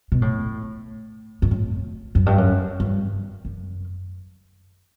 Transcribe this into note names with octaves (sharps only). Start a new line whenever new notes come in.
B2
A2
G2
A2
F#2
G2
F#2
G2
F#2